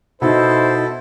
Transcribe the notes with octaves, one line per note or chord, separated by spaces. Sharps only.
B2 D#4 E4 A4 C5